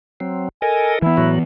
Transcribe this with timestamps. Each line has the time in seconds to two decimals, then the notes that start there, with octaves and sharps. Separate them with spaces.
0.20 F#3 C4
0.62 A4 A#4 D#5 G#5
1.02 E3 B3 E4
1.17 A2 F#3 F#4